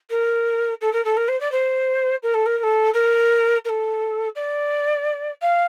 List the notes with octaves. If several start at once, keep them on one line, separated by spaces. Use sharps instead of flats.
A#4
A4
A#4
A4
A#4
C5
D5
C5
A#4
A4
A#4
A#4
A4
A#4
A#4
A4
D5
F5